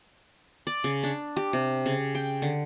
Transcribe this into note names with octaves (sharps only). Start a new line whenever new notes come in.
D5
C#3
D4
G4
C3
C#3
G5
D3